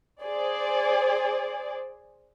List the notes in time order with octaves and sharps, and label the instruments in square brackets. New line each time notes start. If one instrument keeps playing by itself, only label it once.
[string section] G#4 C5 D5